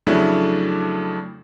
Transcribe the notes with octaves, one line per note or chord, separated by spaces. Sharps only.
F2 C#3 F#3 A3 D4 E4